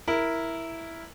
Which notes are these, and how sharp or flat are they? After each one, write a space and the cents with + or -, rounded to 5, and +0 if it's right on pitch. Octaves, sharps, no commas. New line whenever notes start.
E4 +0 A#4 +0